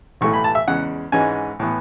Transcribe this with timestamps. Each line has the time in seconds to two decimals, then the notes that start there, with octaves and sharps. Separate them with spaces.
0.21 B1 A2 E3 A3 E4 C#6
0.33 B5
0.44 A5
0.55 E5
0.68 E2 C#3 G#3 F#5
1.12 G#2 E3 G#3 C#4 G#5
1.60 A2 E3 B3